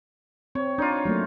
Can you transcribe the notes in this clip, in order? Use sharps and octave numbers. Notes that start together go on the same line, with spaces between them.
C4 C#5
D4 D#4 F4 D5
F#3 A3 A#3